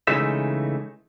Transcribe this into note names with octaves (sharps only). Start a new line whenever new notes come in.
C#3 E3 G#3 A3 D#4 E5